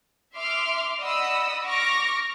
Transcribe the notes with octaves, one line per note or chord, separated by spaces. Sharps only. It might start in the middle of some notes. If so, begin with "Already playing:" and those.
E5 C6 D6 F6
D5 D#5 F#5 B5 D#6 E6
C#6 D6 F6 A#6 D7